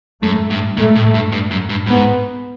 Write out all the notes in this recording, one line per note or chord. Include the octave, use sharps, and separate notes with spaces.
F#2 A3
G2
A#2 A3
A2
G2
G2
F#2
G2
G#2 B3